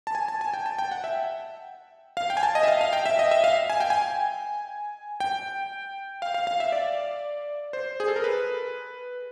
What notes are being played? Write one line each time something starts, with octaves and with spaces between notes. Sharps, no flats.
A5
G#5
A5
G#5
G5
A5
G5
F#5
E5
F5
G5
G#5
A5
D#5
E5
F5
F5
G5
E5
D#5
E5
F5
G#5
G5
G#5
G5
F5
F5
F5
E5
D5
C5
G#4
A4
A#4
B4